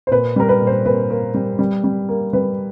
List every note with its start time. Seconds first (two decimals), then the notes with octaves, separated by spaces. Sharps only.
0.07 C5
0.11 A#2 B4
0.36 G3 A#4
0.49 B4
0.61 A#2
0.67 C5
0.85 A#2 B4
1.10 A#3
1.34 G3
1.59 G3
1.84 G3
2.09 A#3
2.33 G3 B4